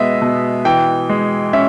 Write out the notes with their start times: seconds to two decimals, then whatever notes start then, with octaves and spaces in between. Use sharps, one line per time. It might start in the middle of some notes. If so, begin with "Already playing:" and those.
Already playing: B2 G#3 B3 D#5 E5
0.22 B2
0.65 E3 G5
1.10 G#3
1.53 C#4 E5